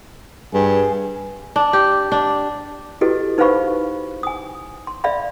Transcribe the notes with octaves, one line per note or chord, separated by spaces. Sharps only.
G2 G#4
D4
G4
D4
E4 F#4 G4 A4 B4 D#5
D#4 B4 C5 F5 B5 C#6
G#5 D#6
C6
D5 E5 F5 B5